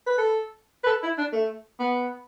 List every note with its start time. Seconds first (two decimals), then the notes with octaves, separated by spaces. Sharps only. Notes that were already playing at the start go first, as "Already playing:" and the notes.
0.07 B4
0.18 A4
0.84 B4
0.87 A4
1.03 E4
1.18 D4
1.32 A3
1.79 B3